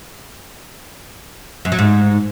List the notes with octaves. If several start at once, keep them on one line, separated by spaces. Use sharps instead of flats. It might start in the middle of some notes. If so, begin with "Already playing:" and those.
F#2
F#3
G#2